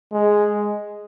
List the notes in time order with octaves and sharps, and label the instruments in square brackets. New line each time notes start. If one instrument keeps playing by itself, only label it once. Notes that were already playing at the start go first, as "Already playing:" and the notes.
[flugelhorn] G#3